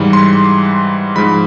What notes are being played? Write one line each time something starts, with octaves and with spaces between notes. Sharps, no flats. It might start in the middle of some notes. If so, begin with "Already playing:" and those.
Already playing: G#2 E3 G3 B5
C6
G#2 F3 G#3 B5